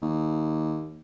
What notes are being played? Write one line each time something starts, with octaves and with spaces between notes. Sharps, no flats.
D#2